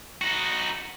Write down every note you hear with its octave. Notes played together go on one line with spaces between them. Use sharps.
D#4 F#4